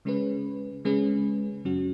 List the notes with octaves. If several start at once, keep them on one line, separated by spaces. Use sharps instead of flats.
C#3 G#3 C#4 G#4 B4
C#3 G#3 C#4 G#4 B4
F#2 C#3 F#3 C#4 F#4